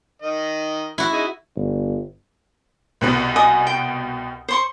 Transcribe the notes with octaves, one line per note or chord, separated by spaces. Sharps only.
D#3 D#5
E4 F#4
D#4 G#4
G1
C2 B2 B3
D#5 G#5 D#6
G5
C5 C6 C#6